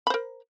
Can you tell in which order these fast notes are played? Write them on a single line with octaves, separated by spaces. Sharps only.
B5 C5 A#4